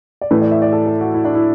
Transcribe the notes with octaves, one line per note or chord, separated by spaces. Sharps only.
D5
A2 E3 A3 B4
D5
E5
D5
A4
A4
F#4
E4
D4
E4